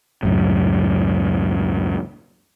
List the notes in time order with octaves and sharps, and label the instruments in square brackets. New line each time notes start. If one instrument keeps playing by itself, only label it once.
[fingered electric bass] C#2 F#2 A2